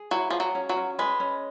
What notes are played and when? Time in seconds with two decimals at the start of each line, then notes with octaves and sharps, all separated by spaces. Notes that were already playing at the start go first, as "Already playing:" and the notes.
Already playing: G#4
0.11 F#3 E4
0.30 F3 G#4
0.40 F#3
0.55 C#4
0.69 F#3
0.76 C#4
0.99 G#3 B4
1.20 C#4